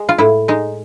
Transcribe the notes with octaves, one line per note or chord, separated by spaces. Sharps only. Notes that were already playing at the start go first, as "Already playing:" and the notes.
Already playing: G#3
F4
A2 E4
G#3 D#4